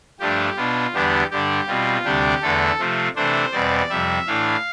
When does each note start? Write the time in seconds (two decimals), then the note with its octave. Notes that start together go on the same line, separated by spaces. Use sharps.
0.20 G2 F3 A3 D4 G4
0.57 B2 B3 D4 F4
0.94 E2 D3 G3 B3 D4 G4
1.31 G2 D3 G3 D4 G4
1.68 B2 G3 C4 F4
2.05 D2 C3 G3 D4 G4
2.42 E2 D3 A3 A4
2.79 C3 F3 A3 C4
3.16 C3 E3 A3 D4 C5
3.52 E2 B2 G3 C4 D5
3.89 F2 C3 G3 E5
4.27 A2 E3 A3 D4 F5